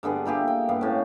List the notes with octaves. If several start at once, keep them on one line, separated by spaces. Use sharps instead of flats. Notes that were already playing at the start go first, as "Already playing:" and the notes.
G2 D3 B3 G#4
A#2 E4 G4 G#4
G5
G2 B3 F5
A2 C#4